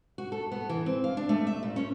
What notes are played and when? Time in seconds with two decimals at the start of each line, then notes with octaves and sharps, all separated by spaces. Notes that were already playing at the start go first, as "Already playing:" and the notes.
0.18 F#4
0.32 A4
0.52 B3
0.69 E3
0.86 C4
1.04 F5
1.17 D4
1.29 A3
1.47 E5
1.63 A#2
1.76 C#4